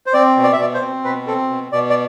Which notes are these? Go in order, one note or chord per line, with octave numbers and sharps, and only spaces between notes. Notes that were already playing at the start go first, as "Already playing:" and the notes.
C5
C4 D5
B2
D5
E5
B2 D5
C5
C4
B2 B4
C4 A4
B2
B2 D5
D5